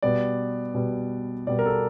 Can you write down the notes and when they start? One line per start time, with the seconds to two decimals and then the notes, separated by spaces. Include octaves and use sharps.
0.02 B2 G3 B3 D5
0.74 B2 G3 B3
1.47 B2 G3 B3 D5
1.59 A#4
1.66 A4